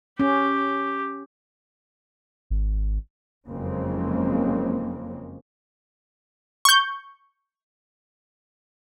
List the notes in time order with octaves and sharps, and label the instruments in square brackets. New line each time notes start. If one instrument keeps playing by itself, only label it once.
[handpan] C#4 [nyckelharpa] G4
[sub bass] G#1
[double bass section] F#1 F2 C#3 G#3 A#3 C4
[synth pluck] C#6 G6